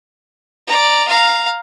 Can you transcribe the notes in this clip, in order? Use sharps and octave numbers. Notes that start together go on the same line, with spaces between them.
D5 A#5
F5 A#5